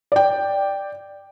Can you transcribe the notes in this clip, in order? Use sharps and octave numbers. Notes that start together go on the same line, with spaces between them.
D5 G5